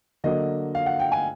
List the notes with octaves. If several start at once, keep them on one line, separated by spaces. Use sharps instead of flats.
D3 F#3 A#3 D#5
F5
F#5
G5
G#5